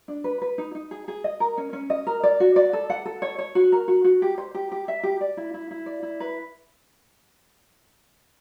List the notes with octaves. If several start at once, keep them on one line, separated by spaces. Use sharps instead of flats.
D4
B4
B4
D#4
D#4
G#4
G#4
D#5
A#4
C#4
C#4
D#5
A#4
D5
F#4
D5
A4
F#5
A4
C#5
C#5
F#4
A#4
F#4
F#4
G4
C5
G4
G4
E5
G4
D5
E4
E4
E4
D5
E4
B4